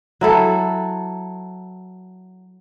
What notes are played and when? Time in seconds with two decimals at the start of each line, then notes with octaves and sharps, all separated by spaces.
0.21 F#3 E4 A4